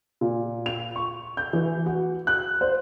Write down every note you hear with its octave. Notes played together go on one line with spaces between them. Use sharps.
A#2
F7
C#6
G6
E3
F#4
F#6
C5